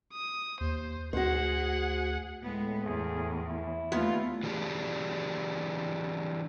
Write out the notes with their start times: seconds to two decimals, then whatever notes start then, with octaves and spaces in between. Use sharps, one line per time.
0.13 D#6
0.61 D#2 C5
1.13 D2 F#4 G#4 C5 F#5
2.43 A2 G#3 B3
2.85 E2 G#4
3.47 E4
3.92 D#2 G3 A3 B3 F4
4.43 E3 G3 A3 D4 G4 G#4